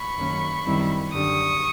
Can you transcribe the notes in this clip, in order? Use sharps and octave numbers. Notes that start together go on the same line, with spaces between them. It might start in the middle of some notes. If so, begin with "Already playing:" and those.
Already playing: B5 C#6
F#2 D#3 F#3 A#3 C#4
F#2 D#3 G3 C4 E4
F#2 D3 G3 C#6 D#6